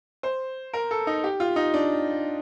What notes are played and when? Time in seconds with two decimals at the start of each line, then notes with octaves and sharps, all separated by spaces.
0.23 C5
0.73 A#4
0.91 A4
1.07 D#4
1.24 G4
1.40 F4
1.56 D#4
1.74 D4